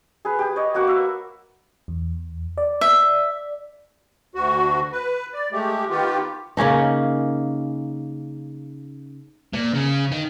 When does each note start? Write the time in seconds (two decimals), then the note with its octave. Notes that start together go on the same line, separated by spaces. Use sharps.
0.25 G#4 B4
0.39 G4 D#6
0.56 C#5 D#5
0.74 A#3 F#4 F#5 D6
0.87 B4 E5
1.88 E2
2.58 D5
2.81 E5
4.35 D2 F#4
4.92 B4
5.34 D5
5.52 G#3 A3 G4
5.90 D#3 B3 F4 G4
6.57 C#3 A#3 C#4 D#4
9.54 A#2
9.74 C#3
10.12 D#3